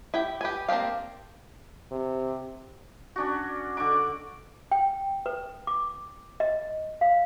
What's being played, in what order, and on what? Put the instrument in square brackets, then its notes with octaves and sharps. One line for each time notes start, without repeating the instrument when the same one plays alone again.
[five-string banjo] E4 G4 G5
G4 B4 G#5
A#3 C4 D4 G4 F5
[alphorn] C3
[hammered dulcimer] C#4 D4 F#4
D3 F#5 C#6 D6
[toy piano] G5
B4
D6
D#5
F5